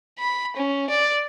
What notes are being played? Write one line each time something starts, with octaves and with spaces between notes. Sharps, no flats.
B5
C#4
D5